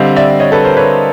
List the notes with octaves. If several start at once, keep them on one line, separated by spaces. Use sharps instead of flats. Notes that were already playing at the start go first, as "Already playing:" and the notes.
Already playing: D3 G3 C4 D#5 F5
D5 E5
C#5 D#5
A4 B4
A#4 C5
B4 C#5